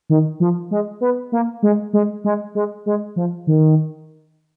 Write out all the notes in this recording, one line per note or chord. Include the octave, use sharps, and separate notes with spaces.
D#3
F3
G#3
B3
A#3
G#3
G#3
G#3
G#3
G#3
F3
D#3